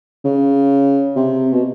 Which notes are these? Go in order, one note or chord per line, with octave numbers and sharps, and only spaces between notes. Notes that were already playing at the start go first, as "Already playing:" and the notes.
C#3
C3
B2